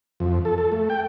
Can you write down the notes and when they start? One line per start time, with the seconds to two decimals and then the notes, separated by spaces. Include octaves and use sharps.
0.20 F2
0.45 A4
0.58 A4
0.72 A3
0.90 G5